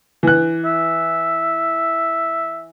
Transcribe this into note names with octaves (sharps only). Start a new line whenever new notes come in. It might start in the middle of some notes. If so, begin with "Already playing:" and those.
E3 F#6
E5